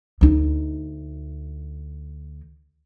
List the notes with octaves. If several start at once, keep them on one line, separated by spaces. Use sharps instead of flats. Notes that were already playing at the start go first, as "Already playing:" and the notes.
D2 D#4